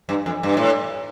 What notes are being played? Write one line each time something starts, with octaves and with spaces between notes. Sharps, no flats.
G2
F2
G2
A2